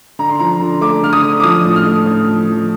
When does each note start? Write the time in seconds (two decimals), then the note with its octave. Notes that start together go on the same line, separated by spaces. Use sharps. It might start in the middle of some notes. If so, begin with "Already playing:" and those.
0.19 D3 A#5
0.30 C6
0.39 F3 A#5
0.60 D3
0.81 A3 D6
1.03 D3 F6
1.13 D#6
1.24 D3
1.40 D6
1.44 F3 D#6
1.65 A2
1.76 F6
1.86 A3
2.06 A2
2.28 F3
2.49 F3